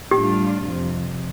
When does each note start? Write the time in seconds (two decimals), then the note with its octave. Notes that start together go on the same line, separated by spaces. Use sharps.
0.11 A2 G3 D4 F4 G4
0.66 F2 C3 F3